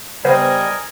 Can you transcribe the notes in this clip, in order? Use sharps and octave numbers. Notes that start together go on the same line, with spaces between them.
C#3 G3 B3 A#4 C5 D#5 G#5